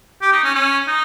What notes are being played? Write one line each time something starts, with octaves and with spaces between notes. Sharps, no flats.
G4
D#4
C#4
C#4
D#4